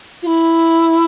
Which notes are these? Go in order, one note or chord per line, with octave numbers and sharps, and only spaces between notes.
F4
E4